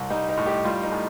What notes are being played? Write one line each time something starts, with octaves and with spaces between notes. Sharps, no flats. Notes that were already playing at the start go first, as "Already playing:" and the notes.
Already playing: C2
G3 D#4
D#4
A2
G4
G3 F4
D#4
A2